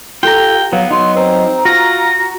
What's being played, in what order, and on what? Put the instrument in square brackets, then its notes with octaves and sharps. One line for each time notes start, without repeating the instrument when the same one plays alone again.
[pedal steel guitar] F4 G4 A#5 [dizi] A4 [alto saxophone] G5
[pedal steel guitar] F#3 [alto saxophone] B3 [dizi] F5
[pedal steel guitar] F#3 D#4 [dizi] C6
[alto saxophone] C4 [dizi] A#5
[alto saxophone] F4 [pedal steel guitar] F#4 [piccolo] A#6